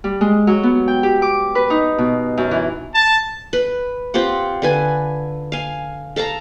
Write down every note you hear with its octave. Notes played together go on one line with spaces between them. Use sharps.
G3
G#3
F#3
B3
G5
G4
D6
B4
D#4
B2
F#2
E3
A5
B4
C4 F4 G4 F#5
D3 B4 G#5
F5 G#5
A4 F5 A5 A#5